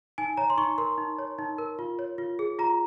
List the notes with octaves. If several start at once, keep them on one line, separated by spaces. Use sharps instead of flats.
D#4 G#5
C#5 A#5
C6
D#4 C#6
A#4 C6
D#4
C#5
D#4
A#4
F4
C#5
F4
G#4
F4 A#5